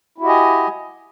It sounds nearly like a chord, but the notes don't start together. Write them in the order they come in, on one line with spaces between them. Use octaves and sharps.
E4 F#4 G4 D#5 G#5